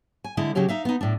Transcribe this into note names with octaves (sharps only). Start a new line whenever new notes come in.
G#5
D3 G#3 E4
C#3 F#3 C#4 G4 C#5
D#4 E5 F5
B3 D#4
A2 D4